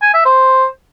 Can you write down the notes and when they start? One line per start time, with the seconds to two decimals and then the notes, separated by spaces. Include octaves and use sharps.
0.02 G#5
0.14 E5
0.26 C5